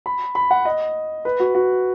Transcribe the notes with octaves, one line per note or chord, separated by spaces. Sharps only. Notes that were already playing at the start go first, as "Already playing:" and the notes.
B5
B5
F#5
D#5
B4
F#4
F#4